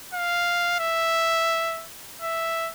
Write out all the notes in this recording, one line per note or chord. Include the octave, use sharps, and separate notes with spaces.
F5
E5
E5